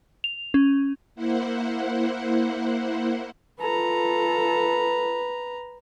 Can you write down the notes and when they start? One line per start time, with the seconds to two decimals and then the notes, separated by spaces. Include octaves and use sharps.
0.24 F7
0.54 C#4
1.15 A#3 E4 C5 F#5
3.60 F4 A4 B4 A#5